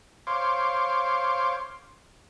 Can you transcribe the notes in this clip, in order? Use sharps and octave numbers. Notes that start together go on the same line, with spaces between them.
C5 C#5 F5 C6 D6